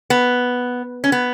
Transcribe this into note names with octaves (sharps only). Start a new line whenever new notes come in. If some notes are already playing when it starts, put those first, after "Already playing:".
B3
C#4
B3